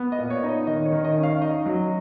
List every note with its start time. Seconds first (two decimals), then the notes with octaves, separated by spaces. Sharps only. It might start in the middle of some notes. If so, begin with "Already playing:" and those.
Already playing: B3
0.12 D#5
0.18 A#2
0.30 C#5
0.44 D#4
0.49 D#5
0.67 D#3 D#5
0.85 C#5
0.92 D#3
1.04 D#5
1.17 C#4
1.23 F5
1.41 D#4 D#5
1.66 F#3